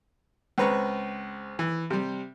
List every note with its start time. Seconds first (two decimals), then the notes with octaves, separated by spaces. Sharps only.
0.58 C#2 C4 B4 A#5 C#6
1.59 E3
1.90 C3 G3